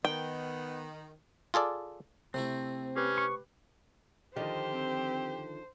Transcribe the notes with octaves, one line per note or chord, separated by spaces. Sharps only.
D#3 B3 G5
F4 G#4 A4 D5
C3 A3 C4 E4
C#4 G4 B4
C#6
D3 D#3 F3 G4 C5 D#5
C4